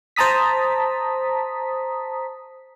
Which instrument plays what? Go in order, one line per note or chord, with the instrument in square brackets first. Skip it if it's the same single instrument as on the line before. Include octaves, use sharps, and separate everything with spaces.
[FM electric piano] C5 A5 A#5 D#6 B6